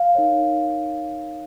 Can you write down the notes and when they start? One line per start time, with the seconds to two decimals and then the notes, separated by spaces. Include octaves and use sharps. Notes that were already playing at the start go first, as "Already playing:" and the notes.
Already playing: F5
0.15 D#4 A#4 C#5